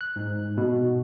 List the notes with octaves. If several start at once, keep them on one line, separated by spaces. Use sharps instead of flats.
F#6
G#2
B2